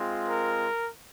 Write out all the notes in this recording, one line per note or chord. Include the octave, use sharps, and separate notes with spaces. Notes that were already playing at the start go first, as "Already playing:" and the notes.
Already playing: G#3 C4 F4
A#4